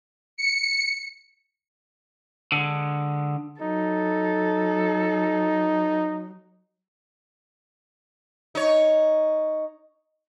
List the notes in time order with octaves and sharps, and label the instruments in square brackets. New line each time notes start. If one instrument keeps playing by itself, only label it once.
[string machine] C#7
[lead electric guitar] D3 G#3
[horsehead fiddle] F#3 [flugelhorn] D#4 [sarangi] A4
[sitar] D#4 C#5